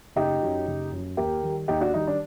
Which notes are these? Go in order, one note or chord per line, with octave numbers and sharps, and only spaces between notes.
F#1 D#4 G4
F#2 F#3
F#1
F#2 F#3
D#2 G4 A#4
D#3 G3
D#2 D#4 G4
D4 F#4
D#3 G3 D#4
D4